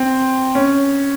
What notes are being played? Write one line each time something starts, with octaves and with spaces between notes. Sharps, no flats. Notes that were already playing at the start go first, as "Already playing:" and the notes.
Already playing: C4
C#4